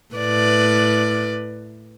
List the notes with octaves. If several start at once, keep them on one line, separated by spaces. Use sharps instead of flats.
A2 B4 D5